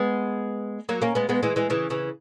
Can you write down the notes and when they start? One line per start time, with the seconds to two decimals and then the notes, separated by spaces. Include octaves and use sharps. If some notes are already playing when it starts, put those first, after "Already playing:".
Already playing: G#3 B3
0.89 F#3 A#3
1.02 A#3 C#4
1.15 G#3 B3
1.29 G#3 B3
1.43 E3 G#3
1.56 E3 G#3
1.70 C#3 E3
1.90 C#3 E3